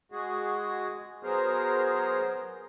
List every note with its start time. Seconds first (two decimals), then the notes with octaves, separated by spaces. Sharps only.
0.12 G#3 F#4 G#4
1.23 F#3 B3 G#4 A#4 C5